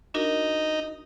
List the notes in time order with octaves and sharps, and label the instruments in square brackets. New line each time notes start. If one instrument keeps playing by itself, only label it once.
[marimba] D4 F#4 A#4 [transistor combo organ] D#4